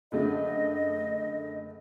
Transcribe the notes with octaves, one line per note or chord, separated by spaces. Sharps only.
F#1 D3 A3 D#5